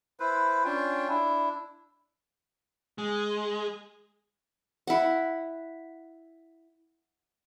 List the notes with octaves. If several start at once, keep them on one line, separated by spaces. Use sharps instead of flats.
E4 B4 C5
C#4 D4 F4 G5
D4 E4
G#3
E4 F#5